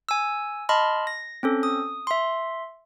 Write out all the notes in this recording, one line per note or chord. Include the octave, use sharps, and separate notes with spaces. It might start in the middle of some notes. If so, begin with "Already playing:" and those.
G#5 E6
D#5 A5 B5 C6 F6
A#6
C4 C#4 A4
D#6
E5 C6